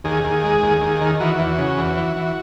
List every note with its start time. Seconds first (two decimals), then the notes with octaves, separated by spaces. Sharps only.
0.04 D#2 G#4
0.24 D#2
0.44 G#3
0.63 D#2
0.81 D#2
1.01 D#3
1.20 E3 F#4
1.39 E2
1.58 C#3
1.78 E2
1.97 E3
2.16 E3